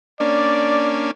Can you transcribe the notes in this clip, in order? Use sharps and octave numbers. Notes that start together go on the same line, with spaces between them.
A#3 C#4 D4 D5